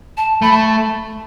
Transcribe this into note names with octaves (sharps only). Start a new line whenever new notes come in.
A5
A3 B5
A5